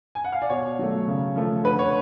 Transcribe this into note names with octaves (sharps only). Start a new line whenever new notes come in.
G#5
F#5
F5
D5
B2 C#5
F#3 A3
C#3
F3 A3
D3 B4
C#5